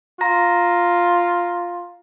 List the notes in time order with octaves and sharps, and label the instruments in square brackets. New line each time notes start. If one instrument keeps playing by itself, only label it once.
[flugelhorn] F4 [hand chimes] A#5 A#6